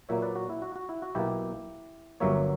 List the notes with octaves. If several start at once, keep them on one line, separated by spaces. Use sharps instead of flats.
A#2 F#3 A#3 C#5 E5
B4 D5
F#4
E4
F#4
F#4
E4
F#4
B1 B2 A#3 E4 G4
G1 G2 F#3 A#3 C#5 E5